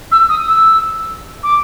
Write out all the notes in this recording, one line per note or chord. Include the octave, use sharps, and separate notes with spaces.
E6
D#6
E6
D6